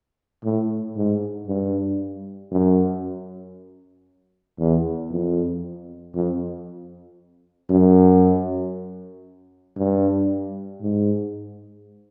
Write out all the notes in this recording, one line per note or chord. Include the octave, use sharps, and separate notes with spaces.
A2
G#2
G2
F#2
E2
F2
F2
F#2
G2
G#2